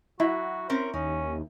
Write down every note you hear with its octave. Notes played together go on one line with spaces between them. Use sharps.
F#3 E4 F#4
C4 C#4 A#4 C5
D#2 C#4 D#4